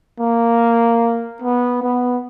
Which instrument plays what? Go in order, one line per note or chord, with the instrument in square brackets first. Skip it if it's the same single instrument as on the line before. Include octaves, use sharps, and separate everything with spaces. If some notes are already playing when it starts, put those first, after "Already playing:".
[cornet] A#3
B3
B3